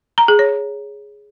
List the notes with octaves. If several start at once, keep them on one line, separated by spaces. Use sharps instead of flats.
A#5
G#4
C#5